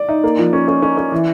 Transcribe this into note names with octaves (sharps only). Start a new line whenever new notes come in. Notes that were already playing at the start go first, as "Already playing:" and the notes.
Already playing: D5
D#4
A#3
F3
C#4
C#4
C#4
C#4
E3